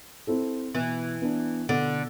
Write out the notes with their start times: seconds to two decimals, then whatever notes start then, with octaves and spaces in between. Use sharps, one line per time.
0.27 C4 E4 A4
0.75 B2 E3
1.22 B3 D4
1.69 B2 D3